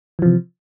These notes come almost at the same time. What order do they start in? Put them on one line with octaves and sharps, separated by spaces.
E3 F3 C3